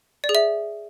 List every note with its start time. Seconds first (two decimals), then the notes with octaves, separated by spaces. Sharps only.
0.24 D5
0.29 G#4
0.35 E5